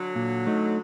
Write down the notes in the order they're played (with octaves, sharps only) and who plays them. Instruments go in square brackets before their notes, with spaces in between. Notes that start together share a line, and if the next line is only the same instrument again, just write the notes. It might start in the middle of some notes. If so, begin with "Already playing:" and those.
Already playing: [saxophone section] D3 F#3
[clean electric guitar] A#2
A3 D#4